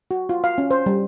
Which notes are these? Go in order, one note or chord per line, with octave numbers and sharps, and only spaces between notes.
F#4
F4
F5
C#4
C5
G3